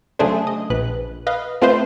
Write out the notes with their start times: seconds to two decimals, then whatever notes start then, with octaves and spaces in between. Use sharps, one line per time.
0.19 C#3 F#3 A3 D4 G#4 C5
0.47 D#5
0.70 A#1 B4 F#6
1.27 B4 D#5 F5
1.62 A3 C4 F4 B4 C5 D#5